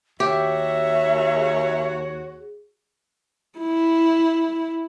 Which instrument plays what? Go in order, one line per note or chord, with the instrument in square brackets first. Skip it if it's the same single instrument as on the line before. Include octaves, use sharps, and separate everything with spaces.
[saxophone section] D#2 F#4 C#5 [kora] G4 [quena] E5
[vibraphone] G#4
[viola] E4